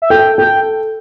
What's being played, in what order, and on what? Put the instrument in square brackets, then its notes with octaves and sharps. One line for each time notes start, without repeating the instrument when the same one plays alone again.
[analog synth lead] E5
[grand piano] A4 [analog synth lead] G5
[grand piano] A4 [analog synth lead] G5